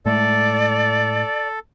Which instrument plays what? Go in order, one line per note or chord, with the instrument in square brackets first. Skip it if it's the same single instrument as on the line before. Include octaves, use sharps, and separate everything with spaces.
[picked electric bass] A2 G#3 A3 [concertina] A4 [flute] D5